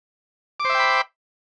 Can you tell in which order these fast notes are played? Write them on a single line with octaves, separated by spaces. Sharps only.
D6 C5 E5 G5 B5